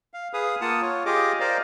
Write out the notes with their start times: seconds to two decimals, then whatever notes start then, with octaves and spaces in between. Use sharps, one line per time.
0.14 F5
0.33 G#4 B4 F5 D#6
0.61 A#3 F4 F#5 A5 D#6
0.82 F4 C#5
1.06 F4 G4 G#4 D#5 D6
1.40 A#4 C5 D5 D#5 F5